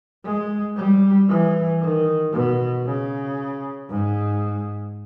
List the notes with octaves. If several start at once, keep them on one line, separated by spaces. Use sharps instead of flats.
G#3
G3
E3
D#3
B2
C#3
G#2